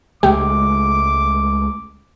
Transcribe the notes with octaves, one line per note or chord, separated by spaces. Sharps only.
C#2 G#3 A3 G4 D6